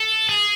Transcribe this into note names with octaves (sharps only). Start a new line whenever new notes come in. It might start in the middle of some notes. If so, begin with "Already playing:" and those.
Already playing: A4
G#4